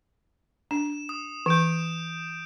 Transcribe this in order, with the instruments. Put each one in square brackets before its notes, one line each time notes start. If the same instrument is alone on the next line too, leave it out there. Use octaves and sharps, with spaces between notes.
[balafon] D4 [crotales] E7
[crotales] D#6
[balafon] E3 [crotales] G6 D7 E7